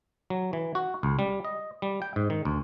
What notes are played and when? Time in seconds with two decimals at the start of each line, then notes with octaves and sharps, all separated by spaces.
0.30 F#3
0.53 E3
0.75 F#4
1.03 C#2
1.19 G3
1.45 D#5
1.82 G3
2.02 G5
2.16 G#2
2.30 D#3
2.45 D2